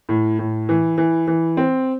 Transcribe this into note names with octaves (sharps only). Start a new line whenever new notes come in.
A2
A2
E3
E3
E3
C4